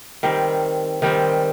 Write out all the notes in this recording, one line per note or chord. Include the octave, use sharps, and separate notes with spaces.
D#3 G3 C4
D#3 G3 C4